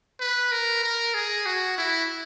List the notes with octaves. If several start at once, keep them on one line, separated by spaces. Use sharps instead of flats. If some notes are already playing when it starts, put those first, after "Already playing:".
B4
A#4
A#4
G#4
F#4
E4